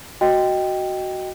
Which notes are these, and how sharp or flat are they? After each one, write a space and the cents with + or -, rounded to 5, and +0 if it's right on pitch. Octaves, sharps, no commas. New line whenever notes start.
F#4 +10 D#5 +0 G5 +0